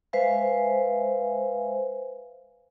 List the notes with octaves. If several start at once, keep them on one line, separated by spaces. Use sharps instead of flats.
G#3 B4 C5 E5 F5 G#5